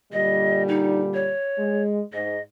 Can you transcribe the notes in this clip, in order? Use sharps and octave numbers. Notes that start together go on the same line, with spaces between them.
A#2 D3 G3 D#5
D#4
C#5
G#3
G#2 D#5